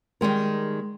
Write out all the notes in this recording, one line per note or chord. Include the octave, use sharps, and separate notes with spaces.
D#3 G3 G#3 A#4